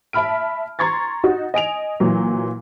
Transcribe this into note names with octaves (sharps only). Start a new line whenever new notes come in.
E5 A5 B5 F6 D7
A#5 C6 C#6 G#6 A6
D#4 F#4
D#5 G#5 D7 F7
A#2 E3 F#3